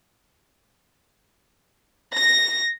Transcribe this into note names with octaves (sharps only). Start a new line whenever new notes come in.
A#6